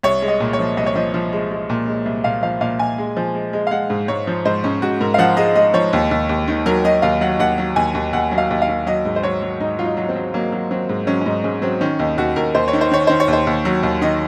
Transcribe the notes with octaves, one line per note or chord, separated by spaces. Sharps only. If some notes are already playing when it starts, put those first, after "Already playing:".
C2 C#5
G#3
D#5
A#2
C#5
F3
C2 D#5
C#5
F3 D#5
F3
G#3
G#3
A#2
G#3
C2
A#2 F5
F3 F5
A#2 F5
A#2 G#5
G#3
F3
G#3
G#3
F5
G#3 F#5
G#2
G#2 C#5
F3
G#2 C5
G#2 C#4
G#2 F#4
G#2 A#4
F5
F3 F#5
G#3 D#5
G#3 D#5
F3 C#5
D#2
D#2
D#2
D#3
F#3 A#4
F#3 D#5
D#2 F5
F#3 F#5
D#2 F#5
F#3
D#2 G#5
D#2
D#2 F#5
F#3
F5
D#2
F5
D#2
F#3 D#5
G#2
C5
F#3 C#5
F#3
G#2 D#4
F#3 F4
D#4
F#3
C4
F#3
F#3 A#3
F#3
F#3 C4
G#2
F#3 C#4
C#4
G#2 D#4
G#2 C#4
F#3 C4
D#3 C#4
D#2 D#4
D#2 F#4
D#2 A#4
D#2 C5
C#5
D#3
C5
D#3 C#5
D#3 C5
C#5
D#2
C5
D#2
F#3
D#2
D#3 D#5